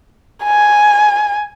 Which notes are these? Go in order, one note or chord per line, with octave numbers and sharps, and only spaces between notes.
G#5